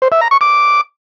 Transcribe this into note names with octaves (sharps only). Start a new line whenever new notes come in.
C5
E5
A#5
C#6
D6